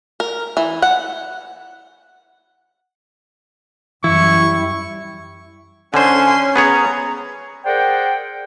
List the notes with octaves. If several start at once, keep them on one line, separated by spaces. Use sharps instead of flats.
A#4
E3
F#5
F#2 E3 G3 E4 C#6
D3 C#4 C5 G#5 C6
B3 G#4 C#5 A#5
G#4 A#4 C5 D5 F#5 G5